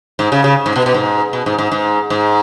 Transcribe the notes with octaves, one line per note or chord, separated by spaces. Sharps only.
G#2
C#3
C#3
G#2
B2
B2
G#2
B2
G#2
G#2
G#2
G#2